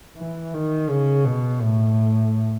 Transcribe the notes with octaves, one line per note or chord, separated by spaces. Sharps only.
E3
D#3
C#3
B2
A2